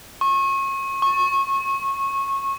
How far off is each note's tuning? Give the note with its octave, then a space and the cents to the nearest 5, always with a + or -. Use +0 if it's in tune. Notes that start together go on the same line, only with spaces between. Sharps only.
C#6 -30
C#6 -20